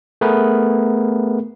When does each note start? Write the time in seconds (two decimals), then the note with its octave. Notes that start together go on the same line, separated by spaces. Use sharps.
0.21 A3 B3 G#4 A#4 B4